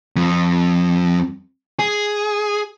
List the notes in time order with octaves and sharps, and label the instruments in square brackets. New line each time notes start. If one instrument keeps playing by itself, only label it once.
[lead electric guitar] F2
G#4